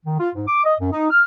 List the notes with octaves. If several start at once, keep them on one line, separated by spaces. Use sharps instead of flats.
D#3
F4
G#2
D6
D#5
F#2
D#4
F6